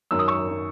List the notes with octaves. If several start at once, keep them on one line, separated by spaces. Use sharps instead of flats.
F#2 D#3 F#3 E6
D#6
C#6 E6
D#3 F#3